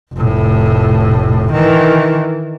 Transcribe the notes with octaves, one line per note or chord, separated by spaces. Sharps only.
F1 A2
D#3 E3